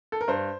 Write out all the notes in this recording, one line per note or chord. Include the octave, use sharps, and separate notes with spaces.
A4
A#4
G2 C5